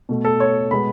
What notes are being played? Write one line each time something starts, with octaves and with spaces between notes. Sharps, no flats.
B2 A3
A4
C#5
B2 G#3 B3 B5